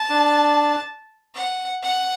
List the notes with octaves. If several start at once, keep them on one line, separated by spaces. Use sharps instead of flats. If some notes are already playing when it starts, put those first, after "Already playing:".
Already playing: A5
D4
F#5
F#5